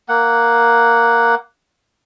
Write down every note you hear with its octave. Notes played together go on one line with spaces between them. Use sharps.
A#3 F#5